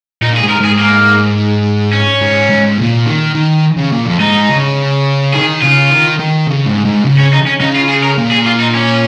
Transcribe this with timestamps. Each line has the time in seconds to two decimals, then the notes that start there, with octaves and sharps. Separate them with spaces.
0.22 A#2 D#4
0.37 G#4
0.41 G#2
0.50 A#4
0.61 G#2 G#4
0.79 A#3
1.93 C#4
2.21 G#2
2.50 G#2
2.78 A#2
3.06 D#3
3.35 D#3
3.77 C#3
3.92 A#2
4.06 F2
4.20 G#2 D#4
4.49 C#3
5.34 D#3 G#4
5.62 C#3 F4
5.91 D#3
6.19 D#3
6.47 C#3
6.66 G#2
6.85 G#2
7.04 C#3
7.19 C#4
7.33 D#4
7.47 C#4
7.61 C#3 D#4
7.76 F4
7.89 G#4
8.03 A#4
8.18 A#2
8.31 G#4
8.46 F4
8.60 D#4
8.75 C#4